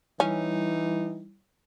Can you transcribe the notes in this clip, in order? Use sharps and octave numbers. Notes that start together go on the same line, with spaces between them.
E3 G3 C#4 D#4 E4